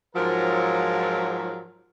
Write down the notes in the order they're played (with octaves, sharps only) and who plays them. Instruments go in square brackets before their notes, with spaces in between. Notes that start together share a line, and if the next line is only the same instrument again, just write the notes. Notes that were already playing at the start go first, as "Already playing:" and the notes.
[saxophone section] G#2 F#3 [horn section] F3 A#4